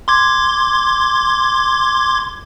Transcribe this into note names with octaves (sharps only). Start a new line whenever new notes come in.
C6 D6 G#6